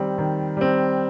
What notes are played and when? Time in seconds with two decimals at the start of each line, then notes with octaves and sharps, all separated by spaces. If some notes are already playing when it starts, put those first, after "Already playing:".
Already playing: D#3 G3 C4
0.18 D#3
0.57 G3 C4